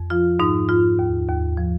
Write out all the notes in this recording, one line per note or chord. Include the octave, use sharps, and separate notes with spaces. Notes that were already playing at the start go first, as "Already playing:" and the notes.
Already playing: F2
F3 F4
G#2 D#4
G#2 F4
D#2
D#2
F3